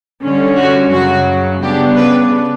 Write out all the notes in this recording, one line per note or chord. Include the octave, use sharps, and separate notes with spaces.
D3 G3 C#4
F#4
F#2 C#3 F#3 F#4
C#3 G3 B3 D4 G4
B4